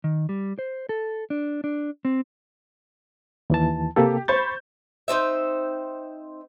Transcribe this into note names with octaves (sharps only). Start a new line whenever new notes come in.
D#3
G3
C5
A4
D4
D4
C4
D#2 E3 A5
C3 A#3 G4 A4
C5 B5 C#6 G6 A6
C4 D#4 C5 E5